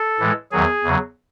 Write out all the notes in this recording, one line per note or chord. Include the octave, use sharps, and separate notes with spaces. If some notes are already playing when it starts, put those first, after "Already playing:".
Already playing: A4
A2 E3 G#3
E2 D#3 F#3 G#4
E2 C#3 F#3